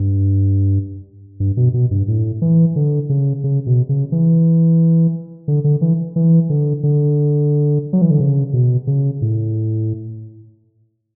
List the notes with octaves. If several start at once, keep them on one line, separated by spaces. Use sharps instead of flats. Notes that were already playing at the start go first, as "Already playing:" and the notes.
Already playing: G2
G2
B2
B2
G2
A2
E3
D3
C#3
C#3
B2
C#3
E3
D3
D3
E3
E3
D3
D3
F#3
E3
D3
C#3
B2
C#3
A2